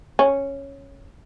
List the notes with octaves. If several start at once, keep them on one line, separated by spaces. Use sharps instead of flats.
C#4